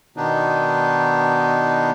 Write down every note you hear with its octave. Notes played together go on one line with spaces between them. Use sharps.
B2 D#3 B3 D4 D#4